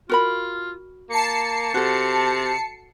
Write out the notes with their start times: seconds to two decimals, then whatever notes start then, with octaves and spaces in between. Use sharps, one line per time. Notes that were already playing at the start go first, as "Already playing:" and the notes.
0.09 F4 F#4 A#4 B5
1.10 A#3 A5 C7 C#7
1.74 C3 F#4 A4